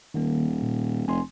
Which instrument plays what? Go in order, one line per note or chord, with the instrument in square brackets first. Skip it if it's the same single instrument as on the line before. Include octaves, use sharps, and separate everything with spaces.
[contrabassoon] D#1 [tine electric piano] D#3 A#3
[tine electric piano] A#2
[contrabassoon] F1 [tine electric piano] G#5 C6